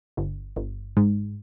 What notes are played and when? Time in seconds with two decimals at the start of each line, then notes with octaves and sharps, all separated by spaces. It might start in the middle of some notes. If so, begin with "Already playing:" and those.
0.17 G1
0.56 G1
0.97 G#2